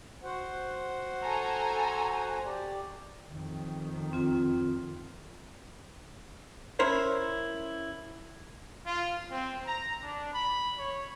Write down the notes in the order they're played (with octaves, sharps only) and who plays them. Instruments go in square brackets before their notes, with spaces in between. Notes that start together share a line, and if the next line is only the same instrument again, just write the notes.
[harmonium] F#4 C5 F#5
[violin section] A4 G#5 A#5
[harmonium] G4 D5
[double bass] F2 D#3
[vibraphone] C4 F4
[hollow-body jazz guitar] C#4 E4 A#4 C5 C#5
[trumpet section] F4
C4
A#5
D4
B5
C#5